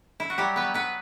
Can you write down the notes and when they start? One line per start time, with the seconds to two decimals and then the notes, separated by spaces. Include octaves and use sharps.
0.20 E4
0.30 F#4
0.38 F#3 G3 G4
0.56 B3 B4
0.62 F#3
0.74 B3 B4